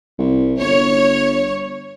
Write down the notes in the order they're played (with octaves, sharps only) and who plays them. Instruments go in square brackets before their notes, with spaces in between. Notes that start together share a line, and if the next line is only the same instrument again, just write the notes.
[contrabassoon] C2
[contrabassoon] G1 [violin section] C#5